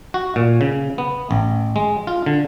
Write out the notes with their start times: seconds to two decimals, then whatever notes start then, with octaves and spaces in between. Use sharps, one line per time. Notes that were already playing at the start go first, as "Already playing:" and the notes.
0.14 F#4
0.36 A#2
0.61 C#3
0.98 B3
1.31 A1
1.76 G#3
2.07 F4
2.26 D3